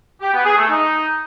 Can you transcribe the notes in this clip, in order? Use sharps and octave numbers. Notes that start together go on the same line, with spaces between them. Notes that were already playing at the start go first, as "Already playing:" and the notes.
G4
B3
G#4
A3
D#4